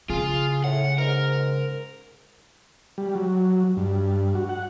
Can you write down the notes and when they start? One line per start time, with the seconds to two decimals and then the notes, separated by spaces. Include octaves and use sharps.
0.10 C#3 F4 G#4
0.64 A2 F#5
0.98 G#2 A#4
2.98 G3
3.15 F#3
3.77 G2
4.35 F#4
4.49 F#5